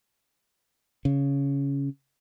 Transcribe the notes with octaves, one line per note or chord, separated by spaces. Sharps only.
C#3